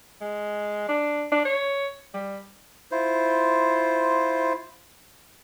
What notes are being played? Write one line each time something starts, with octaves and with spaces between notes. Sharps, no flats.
G#3
D4
D4
C#5
G3
E4 F4 C5